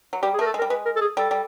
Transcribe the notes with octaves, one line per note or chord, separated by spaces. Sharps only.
F#3
G3 G4
G#4
A3 A#4
A4
G#3
A#4
G3
G#3 B4
A#4
A4
G#4
G3 A4
G3